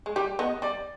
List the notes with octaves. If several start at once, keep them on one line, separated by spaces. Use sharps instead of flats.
G#3
G3 G4
B3 D#5
G3 D5